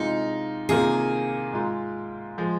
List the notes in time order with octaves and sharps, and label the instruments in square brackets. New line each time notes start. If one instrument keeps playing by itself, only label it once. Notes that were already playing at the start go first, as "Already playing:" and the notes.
Already playing: [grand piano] C3 G#3 F4 [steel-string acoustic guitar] D#4
[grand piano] C3 D#3 A#3 F4 [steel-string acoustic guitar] G#4
[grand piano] G#2 G#3 F4
F3 G#3